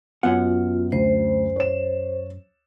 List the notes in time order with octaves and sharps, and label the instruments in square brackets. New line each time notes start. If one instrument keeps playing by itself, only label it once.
[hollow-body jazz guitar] F#2 F#5 [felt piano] B3 [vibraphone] F4
[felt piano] D2 [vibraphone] C5
[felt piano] C#5 E7